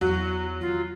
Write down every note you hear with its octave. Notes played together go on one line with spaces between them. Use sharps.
E2 F#3 F#4
D#3 F4